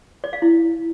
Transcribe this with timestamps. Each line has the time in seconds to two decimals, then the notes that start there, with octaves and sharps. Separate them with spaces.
0.24 D5
0.33 F5
0.42 E4